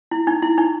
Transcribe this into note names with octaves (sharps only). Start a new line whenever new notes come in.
E4
D#4
E4
D#4